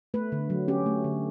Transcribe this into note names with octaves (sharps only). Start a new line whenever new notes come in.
A3 B4
D3
F#3
C#4 G4
A3
D3